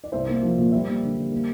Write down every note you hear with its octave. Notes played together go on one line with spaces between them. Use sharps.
D5
C2 C5 E5
A#3
F3
A#2
G3 C5 E5
A#3
D3
G3
A#3